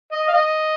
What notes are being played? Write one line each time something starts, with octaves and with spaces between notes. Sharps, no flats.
D#5
F5
D#5